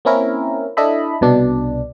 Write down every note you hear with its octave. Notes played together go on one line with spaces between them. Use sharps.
A#3 C4 C#4 E4 A#4
D4 E4 A4 D#5 E5 B5
C2 B2 D4